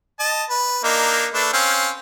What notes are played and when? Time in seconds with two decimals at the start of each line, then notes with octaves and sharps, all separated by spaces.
0.19 D#5 A5
0.49 B4
0.84 A#3 D4 D#4
1.34 A3 D4 B4
1.53 C4 C#4 F5